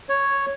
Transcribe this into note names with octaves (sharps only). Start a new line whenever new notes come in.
C#5